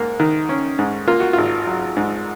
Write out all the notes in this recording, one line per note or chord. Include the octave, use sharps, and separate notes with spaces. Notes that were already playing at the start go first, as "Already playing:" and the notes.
Already playing: G#2 A#3
D#3
C#4
G#2
A#3 F4
F#4
G#1 F4
F#3
G#2